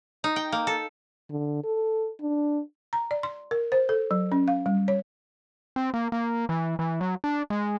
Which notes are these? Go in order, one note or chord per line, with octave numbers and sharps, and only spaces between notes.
D#4
G5
A#3
A4
D3
A4
D4
A#5
D5
C6
A#4
C5
A4
F#3
C#4
F5
G3
C#5
C4
A#3
A#3
E3
E3
F#3
D4
G#3